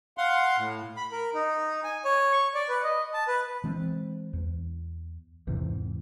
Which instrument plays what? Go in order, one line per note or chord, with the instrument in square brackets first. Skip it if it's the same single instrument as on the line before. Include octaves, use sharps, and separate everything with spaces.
[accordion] F5 F#5 C6
A2
[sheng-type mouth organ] B5
A#4
D#4
G#5
C#5
C#6
D5
B4
D#5
A5
B4
[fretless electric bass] E3 G#3 C4
E2
E2 G#2 C3 E3